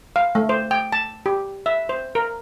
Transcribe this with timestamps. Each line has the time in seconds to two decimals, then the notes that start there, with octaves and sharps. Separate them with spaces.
0.16 F5
0.35 A3
0.49 C5
0.71 G5
0.92 A5
1.26 G4
1.66 E5
1.89 C5
2.15 A#4